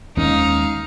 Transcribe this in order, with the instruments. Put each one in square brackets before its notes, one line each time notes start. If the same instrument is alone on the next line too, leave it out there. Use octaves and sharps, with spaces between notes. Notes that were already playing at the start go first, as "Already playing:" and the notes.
[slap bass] D#2 G#3 C#4 [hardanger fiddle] D#4 F5